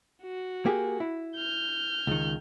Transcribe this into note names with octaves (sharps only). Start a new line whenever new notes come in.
F#4
A#3 G4 G#4
E4
F6 G6
C#2 D#3